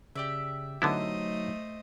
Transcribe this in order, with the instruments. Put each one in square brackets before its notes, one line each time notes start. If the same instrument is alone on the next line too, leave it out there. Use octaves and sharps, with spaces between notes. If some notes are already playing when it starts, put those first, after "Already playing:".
[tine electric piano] C#3 [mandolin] G4 D5 E5
[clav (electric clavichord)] D3 B3 E4 [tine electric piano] F#3 D#4 [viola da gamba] A3 C5 D#5